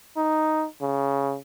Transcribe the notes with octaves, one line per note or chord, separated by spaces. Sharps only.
D#4
C#3